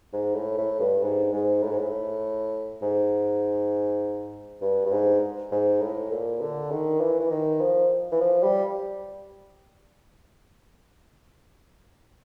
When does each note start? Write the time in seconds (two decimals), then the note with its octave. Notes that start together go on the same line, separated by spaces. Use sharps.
0.13 G#2
0.35 A2
0.58 A2
0.80 G2
1.02 G#2
1.33 G#2
1.62 A2
1.71 G#2
1.79 A2
2.82 G#2
4.61 G2
4.85 G2
4.92 G#2
5.51 G#2
5.81 A2
6.12 A#2
6.41 D3
6.71 D#3
7.01 E3
7.20 E3
7.31 D#3
7.61 F3
8.12 E3
8.21 F3
8.43 G3